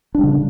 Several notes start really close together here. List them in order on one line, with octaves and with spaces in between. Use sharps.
D4 G3 C#3